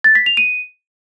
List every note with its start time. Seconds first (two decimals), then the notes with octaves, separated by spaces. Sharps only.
0.04 A6
0.15 B6
0.26 F7
0.37 D#7